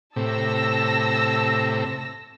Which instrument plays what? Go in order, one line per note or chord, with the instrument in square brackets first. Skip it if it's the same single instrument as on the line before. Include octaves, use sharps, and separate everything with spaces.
[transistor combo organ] A2 C3 [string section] A5 E6 A#6